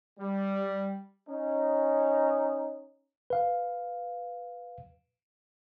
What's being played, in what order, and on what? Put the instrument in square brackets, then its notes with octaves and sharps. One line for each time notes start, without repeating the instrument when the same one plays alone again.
[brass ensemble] G3
[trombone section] C#4 D#4
[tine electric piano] B4 F5